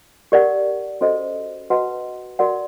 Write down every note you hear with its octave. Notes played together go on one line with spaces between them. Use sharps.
G4 A#4 D5 F#5
C#4 F#4 A4 C5 D#5
F#4 B4 D#5 F#5 A5
F#4 A#4 D5 F#5